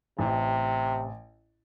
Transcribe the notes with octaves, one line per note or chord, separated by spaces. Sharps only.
A1 C3